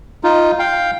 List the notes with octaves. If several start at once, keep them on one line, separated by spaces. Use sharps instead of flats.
D#4 F4
F5 G5